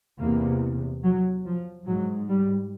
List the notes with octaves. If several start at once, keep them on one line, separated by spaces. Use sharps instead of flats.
E2 C3 A#3
F#3
F3
G#2 F#3
G3